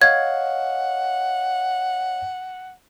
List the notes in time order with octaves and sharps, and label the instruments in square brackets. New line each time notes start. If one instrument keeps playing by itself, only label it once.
[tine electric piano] C#5 D#5 F5 [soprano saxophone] F#5 [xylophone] G#6